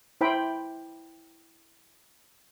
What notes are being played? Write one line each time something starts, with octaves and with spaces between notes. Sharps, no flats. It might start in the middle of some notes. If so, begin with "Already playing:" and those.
E4 C5 G5 B5